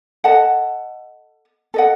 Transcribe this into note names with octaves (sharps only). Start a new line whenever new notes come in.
A4 D#5 F#5 A5
A4 D#5 F#5